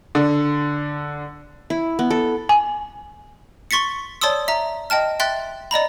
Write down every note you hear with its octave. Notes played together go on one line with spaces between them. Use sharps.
D3
E4
B3
A4
G#5
C6 C#6 A6 B6 C#7
C#5 D5 A5 C6 D#6 E6
E5 A#5
D#5 G5 A5 F6
E5 G5 C6 F#6 A6
D5 D#5 A#5 B5